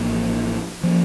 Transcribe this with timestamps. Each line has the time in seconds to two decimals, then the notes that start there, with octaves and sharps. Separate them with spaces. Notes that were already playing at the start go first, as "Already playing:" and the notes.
Already playing: A1 A2 F3 A#3
0.83 F3 A#3 C#4